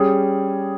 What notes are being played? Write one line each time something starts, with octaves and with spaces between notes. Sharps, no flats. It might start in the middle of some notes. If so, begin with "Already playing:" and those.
Already playing: G3 C#4 G#4